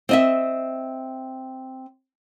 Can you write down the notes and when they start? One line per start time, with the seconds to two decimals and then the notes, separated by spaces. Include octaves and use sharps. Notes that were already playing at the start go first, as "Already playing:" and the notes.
0.09 C4 D#5 E5